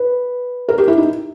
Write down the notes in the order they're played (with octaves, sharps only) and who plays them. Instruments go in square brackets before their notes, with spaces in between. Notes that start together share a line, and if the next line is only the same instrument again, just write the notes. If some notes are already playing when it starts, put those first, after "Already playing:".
Already playing: [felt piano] B4
A#4
G4
E4
D#4